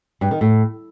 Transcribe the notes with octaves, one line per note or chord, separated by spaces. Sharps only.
G2
D#3
A2